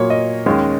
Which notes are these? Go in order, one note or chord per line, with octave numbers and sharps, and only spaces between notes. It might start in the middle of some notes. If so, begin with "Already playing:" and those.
Already playing: A#2 F#3 A#3 C#5
D#5
D#2 D#3 G#3 C#4